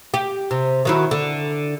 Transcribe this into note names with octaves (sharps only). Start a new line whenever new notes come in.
G4
C3
D#3 F#3 E4
D3